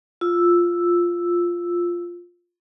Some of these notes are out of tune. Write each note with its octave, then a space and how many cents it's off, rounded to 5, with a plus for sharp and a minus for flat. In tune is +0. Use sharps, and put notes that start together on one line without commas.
F4 +0 E6 +0